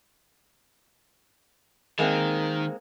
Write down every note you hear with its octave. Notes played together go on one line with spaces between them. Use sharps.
D#3 G#3 A#3 C4